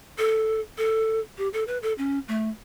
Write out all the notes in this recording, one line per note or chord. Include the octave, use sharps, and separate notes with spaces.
A4
A4
G4
A4
B4
A4
C#4
A3